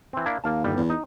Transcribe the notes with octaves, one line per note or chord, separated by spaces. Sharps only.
E3 C4
A#3 D4 E4
D#2 A#3 F5 A5
G1 G3
E2
D#4